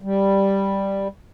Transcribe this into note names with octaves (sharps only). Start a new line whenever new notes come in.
G3